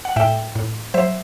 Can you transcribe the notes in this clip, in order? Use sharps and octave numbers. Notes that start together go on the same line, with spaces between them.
F#5
A2 E5 G5
A2
F#3 C5 E5